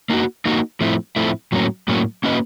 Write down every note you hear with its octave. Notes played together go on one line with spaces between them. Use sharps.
A#3 D#4 F#4
A#3 D#4 F#4
A2 F3 A3 C4 E4
A2 F3 A3 C4 E4
A2 F#3 A#3 C#4
A2 F#3 A#3 C#4
A#3 C#4 F#4 B4 D#5